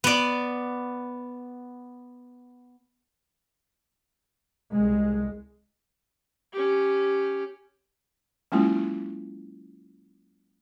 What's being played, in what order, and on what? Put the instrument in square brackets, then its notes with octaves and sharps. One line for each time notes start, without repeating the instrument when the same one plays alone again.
[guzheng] B3 D5
[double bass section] C2 G#3
[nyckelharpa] C#4 G4
[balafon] F#3 G#3 A#3 C#4 E4 F4